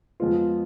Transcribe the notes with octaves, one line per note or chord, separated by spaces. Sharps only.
F2 F3 G#3 B3 F4